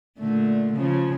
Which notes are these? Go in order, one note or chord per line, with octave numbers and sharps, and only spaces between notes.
A#2 D3 A3
C#3 F3 C#4